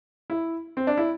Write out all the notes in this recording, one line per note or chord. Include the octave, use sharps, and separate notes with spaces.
E4
C4
D4
E4